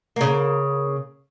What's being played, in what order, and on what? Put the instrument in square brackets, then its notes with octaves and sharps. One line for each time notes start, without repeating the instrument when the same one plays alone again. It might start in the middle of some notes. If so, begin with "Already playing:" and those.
[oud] C#3 A#3